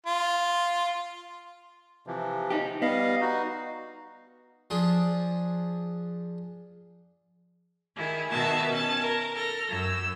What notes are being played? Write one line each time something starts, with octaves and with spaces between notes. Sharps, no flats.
F4
C3 E3 F3
D#4 G4
G3 B3 D#5 F5
D#4 F#4
F3 D4 G#4
D#3 E4 G#4
B2 D#3 F#4 E5 A5
C#4 A5
A#4
A4 F6 A#6
F#2 E6